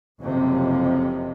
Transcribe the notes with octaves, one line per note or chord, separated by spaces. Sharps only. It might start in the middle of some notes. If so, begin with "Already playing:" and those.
F#1 F2 C3 F3